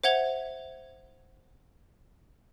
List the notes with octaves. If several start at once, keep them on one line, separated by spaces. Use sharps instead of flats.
C5 E5 F#5 G#6 F7 G7